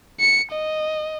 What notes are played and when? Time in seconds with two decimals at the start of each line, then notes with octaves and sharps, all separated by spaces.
0.20 C#7
0.52 D#5